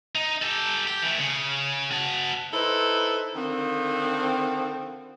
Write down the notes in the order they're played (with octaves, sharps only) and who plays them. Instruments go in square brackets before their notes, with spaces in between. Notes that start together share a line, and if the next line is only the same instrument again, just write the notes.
[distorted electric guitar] D#4
G4 A4
G4
E3 A3
C#3
F#4 A5
[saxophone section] D#4 E4 A4 B4 C5
D3 D#3 F3 C4